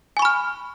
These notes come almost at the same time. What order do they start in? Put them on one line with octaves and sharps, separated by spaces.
G#5 C#6 B5 F6